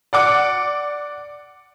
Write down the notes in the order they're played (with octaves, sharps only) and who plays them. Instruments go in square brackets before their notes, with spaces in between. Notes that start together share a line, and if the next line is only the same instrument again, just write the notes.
[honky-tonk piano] D5 F#5 D6